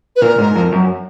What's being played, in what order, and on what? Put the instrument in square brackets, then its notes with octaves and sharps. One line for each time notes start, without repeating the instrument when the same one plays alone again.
[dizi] B4
[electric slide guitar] A#2 [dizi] A#4
[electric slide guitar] G#2
F2
F#2